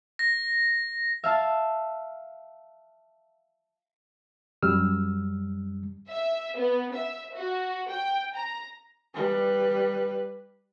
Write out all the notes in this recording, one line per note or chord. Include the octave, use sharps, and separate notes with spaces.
A#6
E5 F5 A5
F#2 G3 E6 F6
E5
B3
E5
F#4
G5
A#5
G3 B4